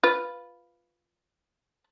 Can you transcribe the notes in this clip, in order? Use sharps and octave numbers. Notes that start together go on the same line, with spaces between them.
F4 B4